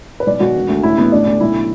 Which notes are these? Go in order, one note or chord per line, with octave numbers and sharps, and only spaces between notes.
B4
B1 D5
B1 F#4
E1
D2
A1 E4
A1 B3
D2 D4
D2
B1 E4